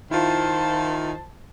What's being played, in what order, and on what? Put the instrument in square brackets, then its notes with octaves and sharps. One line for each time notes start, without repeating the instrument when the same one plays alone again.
[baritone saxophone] D#3 [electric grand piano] E4 F4 [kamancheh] C5 A5